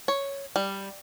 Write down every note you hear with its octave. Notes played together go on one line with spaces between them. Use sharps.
C#5
G3